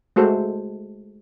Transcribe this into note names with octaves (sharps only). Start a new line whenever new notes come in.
G#3 A3 F#4 A4 C5